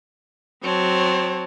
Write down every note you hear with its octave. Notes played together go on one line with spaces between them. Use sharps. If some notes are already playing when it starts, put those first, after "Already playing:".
F#3 C4 C#5 A5